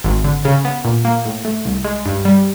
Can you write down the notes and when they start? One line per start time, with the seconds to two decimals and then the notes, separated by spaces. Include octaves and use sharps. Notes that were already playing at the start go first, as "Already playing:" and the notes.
0.04 G#1
0.24 D3
0.45 C#3
0.65 B3
0.85 A#2
1.05 A#3
1.25 A2
1.45 A3
1.65 C2
1.85 G#3
2.06 G2
2.25 G3